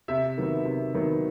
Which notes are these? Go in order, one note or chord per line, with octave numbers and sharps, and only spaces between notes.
C3 E5
D#3 F#3 B3
C3
D#3 F#3 B3